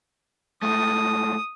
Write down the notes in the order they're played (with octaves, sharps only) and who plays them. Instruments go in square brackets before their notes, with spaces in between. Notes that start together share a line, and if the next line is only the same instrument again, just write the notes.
[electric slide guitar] G#2 A3 [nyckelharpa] D#6